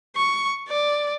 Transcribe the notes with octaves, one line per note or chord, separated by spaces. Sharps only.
C#6
D5